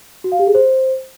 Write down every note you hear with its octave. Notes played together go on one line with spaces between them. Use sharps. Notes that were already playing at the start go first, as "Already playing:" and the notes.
F#4
F5
G4
G#4
C5